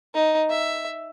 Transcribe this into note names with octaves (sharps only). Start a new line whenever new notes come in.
D#4
E5